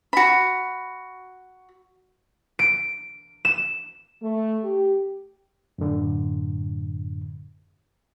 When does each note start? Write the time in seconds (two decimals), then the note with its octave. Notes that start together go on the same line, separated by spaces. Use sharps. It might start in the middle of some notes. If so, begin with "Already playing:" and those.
0.13 F#4 B5
2.59 D7
3.45 E7
4.22 A3
4.63 G4
5.78 F#2 A2 D3